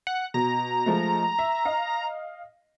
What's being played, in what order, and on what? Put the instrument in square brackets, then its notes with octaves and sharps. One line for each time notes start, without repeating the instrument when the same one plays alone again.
[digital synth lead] F#5
[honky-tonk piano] B2 [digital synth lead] A#5
[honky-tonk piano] F3 G#3 A3
E5
D#5 F5